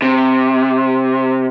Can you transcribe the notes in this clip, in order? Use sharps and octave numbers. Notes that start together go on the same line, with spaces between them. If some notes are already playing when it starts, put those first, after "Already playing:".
C3